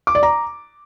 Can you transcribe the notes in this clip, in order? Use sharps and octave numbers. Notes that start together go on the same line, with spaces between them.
D6
D5
A#5